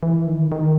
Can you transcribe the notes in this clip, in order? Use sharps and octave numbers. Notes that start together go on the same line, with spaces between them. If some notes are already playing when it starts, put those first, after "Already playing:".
E3
D#3
D#3